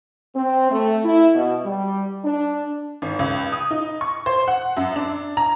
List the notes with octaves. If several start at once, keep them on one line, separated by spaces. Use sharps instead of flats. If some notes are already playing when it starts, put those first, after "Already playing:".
C4
A3
E4
B2
G3
D4
G#1
C#2
D#6
D#4
C#6
C5
F#5
F#2
D4
A#5